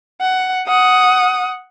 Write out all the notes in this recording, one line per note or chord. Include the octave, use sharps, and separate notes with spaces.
F#5
F#5 D#6